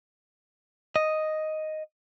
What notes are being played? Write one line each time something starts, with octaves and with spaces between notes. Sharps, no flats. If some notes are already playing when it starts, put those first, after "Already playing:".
D#5